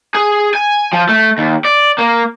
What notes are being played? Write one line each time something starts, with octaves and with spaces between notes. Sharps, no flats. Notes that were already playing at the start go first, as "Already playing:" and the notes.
G#4
G#5
F3
A3
D#2
D5
A#3